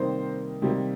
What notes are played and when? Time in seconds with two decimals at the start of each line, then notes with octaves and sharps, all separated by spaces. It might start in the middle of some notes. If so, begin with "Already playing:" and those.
Already playing: C3 D#3 G3 A#3 C5
0.62 C3 D#3 G3 A#3